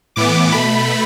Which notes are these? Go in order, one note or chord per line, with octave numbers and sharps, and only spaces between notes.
A2 E3 B3 D6
B2 A3 B5